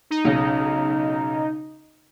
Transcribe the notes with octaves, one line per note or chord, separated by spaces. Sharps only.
D#4
B1 C#3